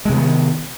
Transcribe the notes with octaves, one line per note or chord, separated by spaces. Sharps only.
C3 D#3 G#3 B3